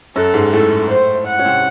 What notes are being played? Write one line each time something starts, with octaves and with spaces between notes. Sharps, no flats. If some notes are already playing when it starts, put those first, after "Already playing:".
F#2 F#3 A4
G#2 G#3
A2 A3 A4
C5
F#5
C#4
C3 C4